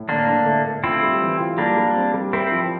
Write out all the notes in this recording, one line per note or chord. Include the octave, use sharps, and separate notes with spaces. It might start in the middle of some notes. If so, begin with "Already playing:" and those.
Already playing: A2
D3 A#3 D4
D3
A3
A3
C4 E4 F4
G3
E3
F4
G3 A#3 D4
G3
C4
G3
C4 E4 A#4
F3